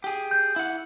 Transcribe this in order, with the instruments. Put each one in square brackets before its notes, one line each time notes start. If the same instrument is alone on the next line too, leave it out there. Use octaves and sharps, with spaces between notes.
[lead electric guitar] G4 G#4
[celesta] G6
[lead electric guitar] E4 F#5